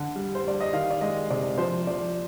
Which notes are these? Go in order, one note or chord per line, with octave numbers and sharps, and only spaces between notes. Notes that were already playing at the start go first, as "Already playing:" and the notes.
Already playing: D3
G3
C5
G3 D5
D#5
D#3 F5
D5
G#3 D#5
C3 D5
F3 C5
F3 D5